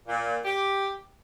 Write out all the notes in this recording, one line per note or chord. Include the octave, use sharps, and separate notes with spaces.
A#2
G4